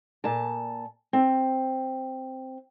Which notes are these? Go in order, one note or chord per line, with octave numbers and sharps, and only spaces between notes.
A#2 A5
C4